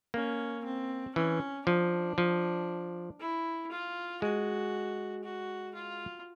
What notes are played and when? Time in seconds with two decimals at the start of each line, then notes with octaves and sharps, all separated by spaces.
0.14 A#3 C#4
0.64 C4
1.16 E3 C#4
1.67 F3 D4
2.18 F3
3.19 E4
3.71 F4
4.22 G#3 F#4
5.23 F#4
5.74 F4